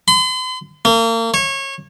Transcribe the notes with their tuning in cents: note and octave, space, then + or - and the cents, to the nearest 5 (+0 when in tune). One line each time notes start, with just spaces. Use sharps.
C6 -45
A#3 -35
C#5 -25